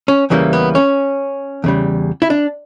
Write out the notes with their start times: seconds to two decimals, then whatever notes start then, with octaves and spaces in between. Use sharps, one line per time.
0.08 C#4
0.30 E2 C#3 E3 G3 A#3
0.53 B3
0.75 C#4
1.64 E2 C#3 G3
2.22 E4
2.30 D4